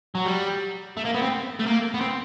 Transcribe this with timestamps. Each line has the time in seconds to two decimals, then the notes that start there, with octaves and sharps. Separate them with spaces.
0.15 F#3
0.26 G3
0.97 A3
1.05 A#3
1.14 B3
1.22 C4
1.59 A3
1.66 A#3
1.94 B3
2.01 C4